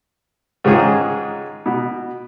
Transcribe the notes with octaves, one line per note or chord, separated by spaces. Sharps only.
G#2 D#3 G#3 C#4 F4 G#4
B2